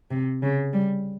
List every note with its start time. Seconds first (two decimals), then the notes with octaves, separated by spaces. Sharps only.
0.11 C3
0.42 C#3
0.73 G3